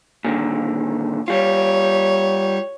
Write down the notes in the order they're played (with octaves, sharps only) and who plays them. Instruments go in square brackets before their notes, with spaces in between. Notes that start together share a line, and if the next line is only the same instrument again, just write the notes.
[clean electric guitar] A#2 D3 D#3
[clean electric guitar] G3 F4 [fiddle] C#5